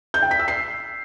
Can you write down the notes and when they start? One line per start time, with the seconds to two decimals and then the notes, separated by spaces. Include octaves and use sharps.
0.14 G6
0.23 G5
0.31 B6
0.39 E6
0.48 C7